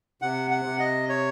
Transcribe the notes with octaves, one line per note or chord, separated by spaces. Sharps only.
C3 F#5
F#5
C3
D#5
C#5